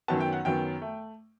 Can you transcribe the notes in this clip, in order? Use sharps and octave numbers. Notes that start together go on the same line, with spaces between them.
F#2 D#3 F#3 B3 A5
G5
F#5
F#2 D#3 F#3 B3 G5
A3